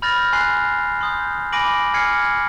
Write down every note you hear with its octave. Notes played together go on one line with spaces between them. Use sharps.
B5 F6 G6 A6 A#6 F7
G#5 C6 F#6 C7
C6 D#6 G6
G#5 B5 D6 A#6 D7 F#7
G#5 F6 G#6 C7 C#7